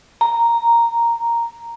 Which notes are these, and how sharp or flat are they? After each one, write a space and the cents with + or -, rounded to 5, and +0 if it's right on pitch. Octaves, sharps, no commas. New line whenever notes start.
A#5 -5